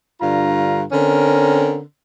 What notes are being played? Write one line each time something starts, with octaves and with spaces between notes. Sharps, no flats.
G2 D3 F4 F5 A#5
D3 C4 C#4 A#4